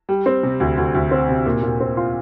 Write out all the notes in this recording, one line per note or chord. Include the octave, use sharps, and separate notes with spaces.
G3
C4
C3
D2
D2
D2
C4
C3
A#2
A#2
C4
F4